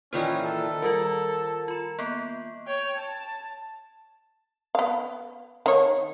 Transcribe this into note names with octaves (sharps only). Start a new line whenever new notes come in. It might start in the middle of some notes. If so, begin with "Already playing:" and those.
A#2 D#3 E3 C#4 C5 D5 G5
A4
D#3 G3 F4 A#4
F4 B5
A#3 B3
C#5 G5
A5
B3 F5
D#3 C#5